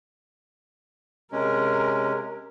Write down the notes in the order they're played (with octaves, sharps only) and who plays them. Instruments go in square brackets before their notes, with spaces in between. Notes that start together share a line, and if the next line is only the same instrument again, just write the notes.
[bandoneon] C3 G#3 C#4 [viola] A#4